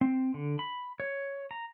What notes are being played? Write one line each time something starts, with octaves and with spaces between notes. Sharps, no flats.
C4
D3
B5
C#5
A#5